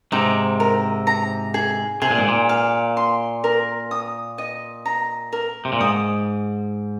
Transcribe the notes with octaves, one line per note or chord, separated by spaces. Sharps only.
G#2 C3 D#4
A#4
A#5
G#4
C3 G#4
A#2
G#2
A#2
F5
C6
A#4
D#6
D#5
A#5
A#4
C3
A#2
G#2 D#6